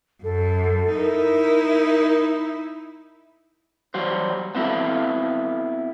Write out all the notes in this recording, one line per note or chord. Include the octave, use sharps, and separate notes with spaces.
F#2 A4
D#4 E4 A#4
F#3 G3 F#4 C5
B3 C4 E4 F#4 A4